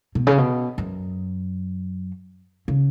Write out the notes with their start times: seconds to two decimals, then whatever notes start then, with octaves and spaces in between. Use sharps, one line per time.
0.15 B2
0.27 C#3
0.38 B2
0.78 F#2
2.68 C#3